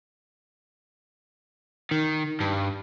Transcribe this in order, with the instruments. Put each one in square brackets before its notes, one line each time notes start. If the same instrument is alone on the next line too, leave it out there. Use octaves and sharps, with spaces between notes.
[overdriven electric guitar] D#3
G2